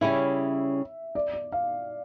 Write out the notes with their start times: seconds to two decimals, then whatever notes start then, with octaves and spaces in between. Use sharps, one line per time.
0.01 C#3 G3 C#4 E4 E5
1.15 D5
1.33 D5
1.52 F5